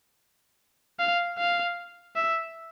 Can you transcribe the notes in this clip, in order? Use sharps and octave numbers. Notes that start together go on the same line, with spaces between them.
F5
F5
E5